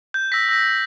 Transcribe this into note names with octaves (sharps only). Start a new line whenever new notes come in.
G6
E6 A#6 B6
E6 A#6 B6